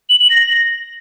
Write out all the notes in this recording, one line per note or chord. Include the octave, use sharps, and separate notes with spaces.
F#7
F#7
A#6